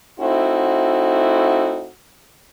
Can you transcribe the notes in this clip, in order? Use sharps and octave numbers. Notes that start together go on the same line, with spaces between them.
A3 C4 D#4 E4 F#4